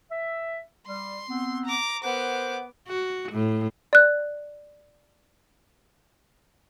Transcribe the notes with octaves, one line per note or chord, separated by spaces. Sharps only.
E5
G3 C6
B3 C4
A#5 D6
B3 A#4 C5 F#5 D6
F#4
A2
D5 F#6